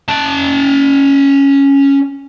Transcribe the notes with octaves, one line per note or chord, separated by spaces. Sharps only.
C#4 A5